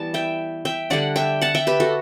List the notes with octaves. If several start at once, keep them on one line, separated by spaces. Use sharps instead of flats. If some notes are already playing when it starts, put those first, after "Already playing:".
Already playing: E3 G3 B3 A5
E5 G5
E5 G5
D3 G3 D4 D5 F#5
E5 G5
F#5 A5
E5 G5
G4 B4
F#4 A4